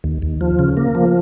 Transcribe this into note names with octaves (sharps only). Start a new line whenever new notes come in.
D#2
D#2
F3
C#3
A#3
F3